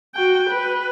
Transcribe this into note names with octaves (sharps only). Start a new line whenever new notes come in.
F#4 G5
B4